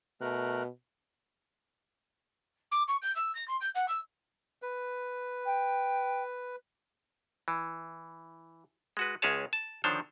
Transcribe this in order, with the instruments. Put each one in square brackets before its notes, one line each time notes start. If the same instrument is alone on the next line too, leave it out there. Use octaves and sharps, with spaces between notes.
[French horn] B2 [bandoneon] A3 A#4 F#6
[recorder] D6
C#6
G6
E6
A#6
C6
G6
F#5
E6
[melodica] B4
[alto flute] G5
[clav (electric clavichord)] E3
G#3 F#4 B4
C#2 G#3 C#4 G#4 C#5 A5
A5
D3 D#3 F3 D4 C5 C#5